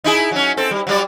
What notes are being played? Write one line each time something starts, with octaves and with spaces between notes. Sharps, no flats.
D#4 E4 G#4
F#3 C#4
C4 A4
G3
F#3 G3 D5